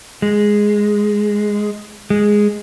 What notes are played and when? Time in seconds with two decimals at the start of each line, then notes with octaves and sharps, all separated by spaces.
0.22 G#3
2.10 G#3